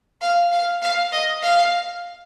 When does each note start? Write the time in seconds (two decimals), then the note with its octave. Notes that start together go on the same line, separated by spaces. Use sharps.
0.21 F5
0.52 F5
0.82 F5
1.12 D#5
1.42 F5